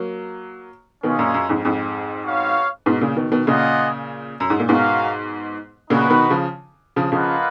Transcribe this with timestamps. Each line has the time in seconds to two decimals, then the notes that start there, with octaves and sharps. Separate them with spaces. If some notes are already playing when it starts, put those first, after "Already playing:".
Already playing: F#3 A#3
1.03 B2 D#3 G#3 C#4 F4 G#4 D#5
1.19 F#2 A#2
1.34 F#2
1.49 F2 G#2
1.65 F2 G#2
2.26 B3 F#4 C#5 F5
2.86 G#2 B2
3.01 A#2 C#3
3.16 B2 D#3
3.32 B2 D#3
3.46 A#2 C#3 A#3 F4 G#4 D#5 F#5
4.40 F#2
4.50 G#2
4.60 A#2
4.69 G#2 B2 C#4 F#4 A#4 F5
5.90 A#2 C#3 D#4 F#4 B4
6.10 B2 D#3
6.30 C#3 F3
6.96 C#3 F3
7.12 C#3 F3 A#3 F4 B4 D#5 F#5